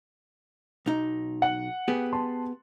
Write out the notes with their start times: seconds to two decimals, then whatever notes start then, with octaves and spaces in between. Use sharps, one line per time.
0.86 B1 D#4
1.42 F#5
1.88 B3 G4 G#4
2.13 A5 C6